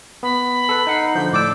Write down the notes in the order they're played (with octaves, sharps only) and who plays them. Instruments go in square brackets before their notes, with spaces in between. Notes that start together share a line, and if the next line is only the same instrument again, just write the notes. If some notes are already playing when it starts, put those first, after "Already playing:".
[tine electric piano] B3 [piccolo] B5
[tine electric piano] A4 B4
D#4 F#5 C7
[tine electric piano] D3 F3 [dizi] G6
[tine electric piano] A2 D5 E6 [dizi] D6